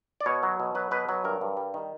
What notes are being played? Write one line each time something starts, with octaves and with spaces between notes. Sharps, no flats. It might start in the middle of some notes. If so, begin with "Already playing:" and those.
D5
B2 C#5
F#3
B2
F#3 B4
B2 B4
F#3 B4
G2 A#4
G2
G3
D#3